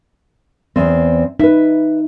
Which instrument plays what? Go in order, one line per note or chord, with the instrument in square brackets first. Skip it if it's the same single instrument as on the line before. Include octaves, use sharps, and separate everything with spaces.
[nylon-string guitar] E2 C4
[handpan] D#4 [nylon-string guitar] B4 E5